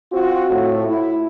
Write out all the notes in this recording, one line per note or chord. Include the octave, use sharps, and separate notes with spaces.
C4 F4 F#4
A2 A3
E4